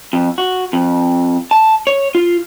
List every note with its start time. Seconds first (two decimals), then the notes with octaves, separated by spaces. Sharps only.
0.13 F2
0.38 F#4
0.73 F2
1.51 A5
1.87 C#5
2.15 F4